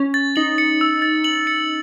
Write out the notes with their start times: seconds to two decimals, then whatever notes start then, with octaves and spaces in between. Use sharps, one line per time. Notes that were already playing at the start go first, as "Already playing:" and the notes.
Already playing: C#4
0.14 A6
0.36 D#4 F#7
0.58 C#7
0.81 E6
1.02 A6
1.24 F#7
1.47 C#7